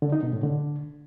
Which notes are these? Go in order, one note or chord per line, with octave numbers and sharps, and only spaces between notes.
D3
D#4
B2
A2
D3